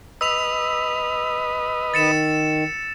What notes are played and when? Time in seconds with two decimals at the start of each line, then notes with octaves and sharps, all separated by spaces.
0.21 B4 D#5 E6 B6 F7
1.94 D#3 A6 C#7 E7